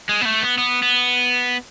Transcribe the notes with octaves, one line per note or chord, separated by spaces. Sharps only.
G#3
B3
A3
B3
B3
B3